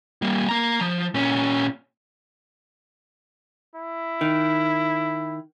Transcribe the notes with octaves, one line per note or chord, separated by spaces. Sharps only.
G3 A#3
A#3 A#5
F3
A#2 C#4
E4
D#3